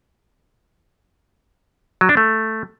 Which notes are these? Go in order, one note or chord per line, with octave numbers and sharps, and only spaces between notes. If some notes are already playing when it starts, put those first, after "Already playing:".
F#3
D4
A3